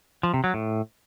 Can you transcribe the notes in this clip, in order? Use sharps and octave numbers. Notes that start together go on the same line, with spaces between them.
F3
C3
F#3
A2